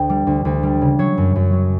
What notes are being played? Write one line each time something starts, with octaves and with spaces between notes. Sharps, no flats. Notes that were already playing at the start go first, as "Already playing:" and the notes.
Already playing: D2 G5
G3
D2
D2
G3
C#3
F#3 C#5
F#2
F#2
F#3